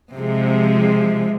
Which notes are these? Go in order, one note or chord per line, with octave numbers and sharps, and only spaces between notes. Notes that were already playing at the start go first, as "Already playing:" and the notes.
C3 F3 G#3